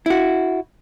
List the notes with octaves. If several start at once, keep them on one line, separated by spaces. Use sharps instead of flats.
E4 F#4